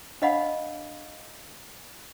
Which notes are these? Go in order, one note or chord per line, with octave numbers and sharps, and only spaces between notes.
D4 C#5 D#5 F5 F#5 B5